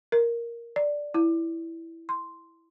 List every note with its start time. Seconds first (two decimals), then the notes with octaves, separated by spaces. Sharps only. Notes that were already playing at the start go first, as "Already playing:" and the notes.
0.12 A#4
0.76 D5
1.14 E4
2.09 C6